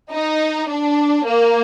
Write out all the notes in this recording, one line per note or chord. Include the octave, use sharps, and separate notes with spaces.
D#4
D4
A#3